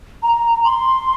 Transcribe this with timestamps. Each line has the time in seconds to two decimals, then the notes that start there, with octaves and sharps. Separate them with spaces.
0.23 A#5
0.65 C6